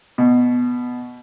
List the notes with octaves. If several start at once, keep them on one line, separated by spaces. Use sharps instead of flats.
B2